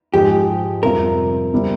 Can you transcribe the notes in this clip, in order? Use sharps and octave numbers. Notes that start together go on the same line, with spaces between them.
G#2 F3 G#3 D#4 G4 G#4
F2 C3 G3 C4 F4 A#4
C3 G3 C4